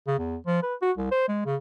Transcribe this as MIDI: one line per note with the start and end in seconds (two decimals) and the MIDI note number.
0.07 0.16 49
0.19 0.36 40
0.47 0.62 53
0.63 0.74 71
0.82 0.91 66
0.98 1.10 36
1.11 1.28 72
1.28 1.41 56
1.46 1.56 49